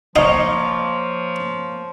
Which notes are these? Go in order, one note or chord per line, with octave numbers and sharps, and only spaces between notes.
F3 A#3 D#4 C#5